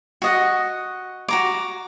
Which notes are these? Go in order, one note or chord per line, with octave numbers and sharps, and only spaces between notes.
F#4 D#5 F#5
F#4 A#5 D6